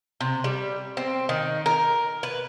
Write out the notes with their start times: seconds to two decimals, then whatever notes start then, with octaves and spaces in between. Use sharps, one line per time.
0.21 C3
0.44 G3
0.97 C4
1.29 D#3
1.66 A#4
2.23 B4